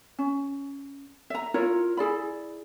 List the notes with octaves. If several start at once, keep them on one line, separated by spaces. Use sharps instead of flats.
C#4
E5 A#5
E4 F4 A#4 C#5
E4 G#4 D5 B5